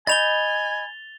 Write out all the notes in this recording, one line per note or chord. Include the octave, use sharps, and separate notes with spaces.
D#5 G#5 B5 G6 A6 F7 G7